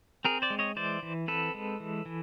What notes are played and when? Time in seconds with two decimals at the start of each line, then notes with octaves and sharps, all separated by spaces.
0.25 C4 G#4 A#4
0.42 C5 D5
0.50 G#3
0.59 C#5 D#5
0.76 E3 C5 D5
1.03 E3
1.28 C4 A4 B4
1.54 G#3
1.80 E3
2.06 E3